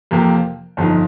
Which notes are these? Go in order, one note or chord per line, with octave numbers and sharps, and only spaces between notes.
F2 C3 F3 A#3 G4
G1 F2 F3 D#4